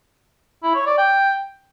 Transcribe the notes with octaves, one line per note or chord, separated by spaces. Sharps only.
E4
C#5
D5
G5